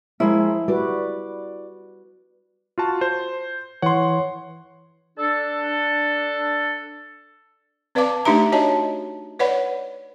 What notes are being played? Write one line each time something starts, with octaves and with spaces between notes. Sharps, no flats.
F3 G#3 A#3 E4
G3 F#4 B4 D5
F4 F#4 A5
C5
E3 C#5 F#5 C6
D4 A4
C4 B4 D5 F5 A5 D6
A3 D4 D#4 G4 E5 A#5
F#4 C#5 D#5 A5
B4 C#5 D5 F#5 B5